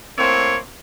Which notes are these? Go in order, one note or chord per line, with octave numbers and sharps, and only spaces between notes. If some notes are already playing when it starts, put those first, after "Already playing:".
A2 A#3 C4 C#5